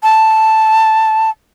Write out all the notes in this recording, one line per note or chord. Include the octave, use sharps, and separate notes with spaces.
A5